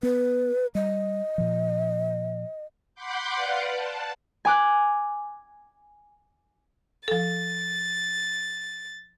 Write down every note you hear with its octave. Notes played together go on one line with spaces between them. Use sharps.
B3 B4
G3 D#5
A#2 F3
F#5 B5 C6 D6 G6
B4 D5 F5 F#5
A5
G#5 D6 F#6
F3 A4 A6